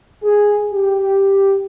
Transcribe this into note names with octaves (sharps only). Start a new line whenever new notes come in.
G#4
G4